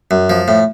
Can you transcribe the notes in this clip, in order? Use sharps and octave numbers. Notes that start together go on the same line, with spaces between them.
F#2
F3
A2